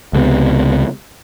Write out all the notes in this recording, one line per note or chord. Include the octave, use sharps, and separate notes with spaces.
C#2 C3 G#3 B3